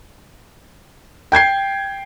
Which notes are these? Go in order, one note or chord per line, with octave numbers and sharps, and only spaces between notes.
G5 G6 G#6 C7